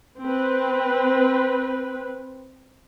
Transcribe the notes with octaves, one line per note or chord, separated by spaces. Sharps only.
C4 B4